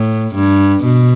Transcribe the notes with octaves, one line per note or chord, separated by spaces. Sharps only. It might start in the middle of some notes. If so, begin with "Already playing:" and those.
Already playing: A2
G2
B2